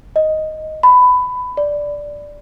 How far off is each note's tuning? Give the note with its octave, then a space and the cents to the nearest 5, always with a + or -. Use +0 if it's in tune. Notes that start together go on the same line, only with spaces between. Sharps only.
D#5 +5
B5 +15
D5 -5